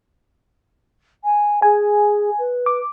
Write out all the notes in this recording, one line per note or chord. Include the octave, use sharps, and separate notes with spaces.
G#5
G#4 G#5
B4
D6